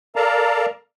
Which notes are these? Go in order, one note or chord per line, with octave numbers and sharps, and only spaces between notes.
A4 A#4 D5 F5 A5 A#5